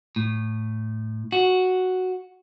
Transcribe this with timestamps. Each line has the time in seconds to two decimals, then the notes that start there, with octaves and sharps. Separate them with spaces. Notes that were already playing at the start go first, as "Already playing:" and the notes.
0.16 A2
1.32 F#4